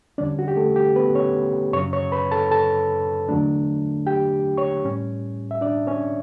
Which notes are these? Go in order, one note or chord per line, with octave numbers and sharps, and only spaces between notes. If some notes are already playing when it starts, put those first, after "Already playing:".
E2 D3 G3 C#4 D4 D5
F#4
G4
A3 A4
G4
B3 B4
C#4 C#5
F#2 C#3 F#3 C#4 C#5 C#6
C#5 C#6
B4 B5
A4 A5
A4 A5
E2 D3 F#3 A3 D4
G4 G5
C#5 C#6
A2 G3 C#4
E5
D4 D5
C#4 C#5